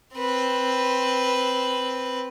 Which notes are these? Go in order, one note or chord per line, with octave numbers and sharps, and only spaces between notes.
C4 B4